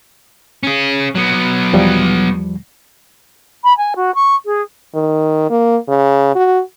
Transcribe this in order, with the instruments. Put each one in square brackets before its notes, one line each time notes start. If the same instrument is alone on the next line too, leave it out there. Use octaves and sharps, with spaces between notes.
[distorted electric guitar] C#4 G#4
F#3 B3
[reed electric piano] E2 F3 G3
[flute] B5
G#5
F#4
C#6
G#4
[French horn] D#3
A#3
C#3
F#4